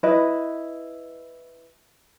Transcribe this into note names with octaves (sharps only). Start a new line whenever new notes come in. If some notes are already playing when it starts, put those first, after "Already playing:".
E4 B4 D#5